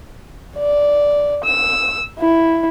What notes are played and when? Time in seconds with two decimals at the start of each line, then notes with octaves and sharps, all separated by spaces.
0.57 D5
1.44 E6
2.19 E4